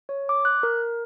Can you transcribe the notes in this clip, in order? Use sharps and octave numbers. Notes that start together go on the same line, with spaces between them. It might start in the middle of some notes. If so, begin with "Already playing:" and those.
C#5
D6
F#6
A#4